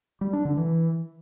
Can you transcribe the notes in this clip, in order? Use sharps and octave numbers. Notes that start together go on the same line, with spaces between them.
G3
D4
D3
E3